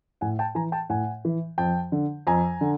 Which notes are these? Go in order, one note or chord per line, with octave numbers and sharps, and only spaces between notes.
A2 F#5 G#5
G5 A5
E3 G#5 A#5
G5 A5
A2 F#5 G#5
E3
F2 G5 A5
D3
F2 G#5 A#5
D3